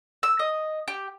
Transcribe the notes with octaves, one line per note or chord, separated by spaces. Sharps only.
E6
D#5
G4